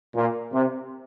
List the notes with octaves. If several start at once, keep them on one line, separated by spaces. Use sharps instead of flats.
A#2
C3